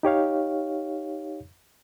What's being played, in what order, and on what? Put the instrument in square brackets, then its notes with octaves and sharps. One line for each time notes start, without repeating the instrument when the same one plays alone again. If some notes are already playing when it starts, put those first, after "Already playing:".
[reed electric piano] D#4 G4 C#5 F5